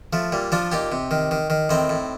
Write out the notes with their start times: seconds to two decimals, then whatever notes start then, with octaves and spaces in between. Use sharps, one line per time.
0.13 F3 A3
0.32 A#2 G3
0.52 F3 D4 F4
0.72 A#2 D#4 G4
0.92 C3
1.11 D#3
1.31 D#3
1.50 D#3
1.70 A2 C4 D#4
1.89 A2